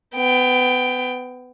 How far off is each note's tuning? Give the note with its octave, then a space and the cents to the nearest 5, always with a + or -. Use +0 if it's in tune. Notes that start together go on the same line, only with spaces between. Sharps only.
B3 +25 G5 +5